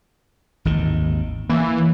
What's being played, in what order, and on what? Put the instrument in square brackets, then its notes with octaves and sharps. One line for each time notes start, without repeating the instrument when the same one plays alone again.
[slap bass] G#1 D#2 D#3
[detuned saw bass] E3 [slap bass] A#3